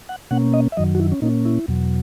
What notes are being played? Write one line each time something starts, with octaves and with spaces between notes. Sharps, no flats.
F#5
B2 A#3 C#4 F#5
D#5
E5
F#2 D#3 F#3 D#5
F#4
E4
C#4
A#2 A#3 C#4 D#4
E4
E2 B2 F#3